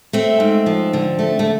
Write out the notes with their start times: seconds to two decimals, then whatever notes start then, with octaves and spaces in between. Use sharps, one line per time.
0.13 A3 C4
0.40 G#2
0.66 F3
0.93 D3
1.19 A3
1.39 A3